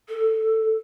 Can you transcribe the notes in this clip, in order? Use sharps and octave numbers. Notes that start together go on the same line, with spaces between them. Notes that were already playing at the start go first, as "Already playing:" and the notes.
A4